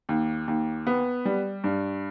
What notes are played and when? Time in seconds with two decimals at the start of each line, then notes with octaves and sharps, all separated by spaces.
0.09 D#2
0.48 D#2
0.87 B3
1.25 G3
1.64 G2